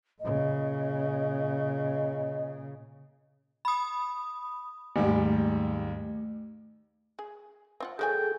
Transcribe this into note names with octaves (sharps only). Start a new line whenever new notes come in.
A#2 C#3 D#5
B5 D#6
D#2 G#2 G3 A3
G#4
C4 F4 F#5
D#3 F#3 G#4 A4 G5 G#5